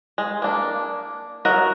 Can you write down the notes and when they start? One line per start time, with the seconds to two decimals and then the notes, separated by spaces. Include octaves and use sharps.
0.18 G#3
0.42 A#3 D4
1.45 F#3 F#4 A#4 D#5 F#5